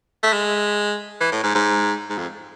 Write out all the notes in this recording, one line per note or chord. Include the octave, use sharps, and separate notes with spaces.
A3
G#3
E3
A2
G#2
G#2
G#2
F2